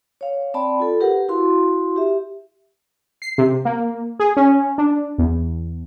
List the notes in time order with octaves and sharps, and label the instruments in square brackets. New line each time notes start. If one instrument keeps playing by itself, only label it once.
[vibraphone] C#5 F5
C4 D5 G5 A5 B5
F4 A4
G4 A#4 B4 F#5
E4 F#4 F5 C6
G4 E5
[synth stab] C7
C3
A#3
G#4
C#4
D4
E2